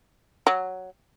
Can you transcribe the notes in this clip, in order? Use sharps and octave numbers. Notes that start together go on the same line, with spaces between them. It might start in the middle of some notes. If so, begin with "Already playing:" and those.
F#3